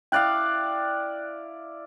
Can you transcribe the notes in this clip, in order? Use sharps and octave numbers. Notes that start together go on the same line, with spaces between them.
E4 D5 F5 G5 F#6